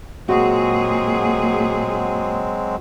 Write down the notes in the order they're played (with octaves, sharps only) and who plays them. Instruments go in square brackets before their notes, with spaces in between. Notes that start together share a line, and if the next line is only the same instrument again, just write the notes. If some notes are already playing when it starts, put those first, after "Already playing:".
[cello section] A#2 G#4 [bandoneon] F#3 G#3 C4 [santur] F#4